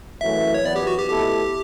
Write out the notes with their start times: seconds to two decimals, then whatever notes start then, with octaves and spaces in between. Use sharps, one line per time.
0.21 F#2 C#3 E3 A3 E5
0.54 C#5
0.65 F#2 E3 B3 D5
0.76 G4
0.87 F#4
0.98 G4
1.09 B2 A3 E4 G4 A4